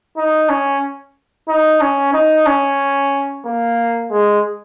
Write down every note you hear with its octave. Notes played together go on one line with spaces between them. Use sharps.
D#4
C#4
D#4
C#4
D#4
C#4
A#3
G#3